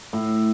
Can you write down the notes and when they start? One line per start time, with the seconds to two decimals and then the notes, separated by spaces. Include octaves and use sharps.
0.13 A2